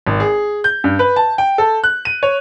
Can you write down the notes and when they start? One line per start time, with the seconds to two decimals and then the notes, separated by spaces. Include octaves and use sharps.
0.07 G#1
0.20 G#4
0.64 G6
0.84 G2
0.99 B4
1.16 A5
1.38 G5
1.58 A4
1.84 F#6
2.05 D#7
2.23 C#5